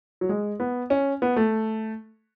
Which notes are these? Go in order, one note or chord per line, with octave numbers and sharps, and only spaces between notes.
F#3
G#3
B3
C#4
B3
A3